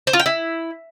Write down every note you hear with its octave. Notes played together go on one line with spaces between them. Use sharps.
C5
F4
G5
E4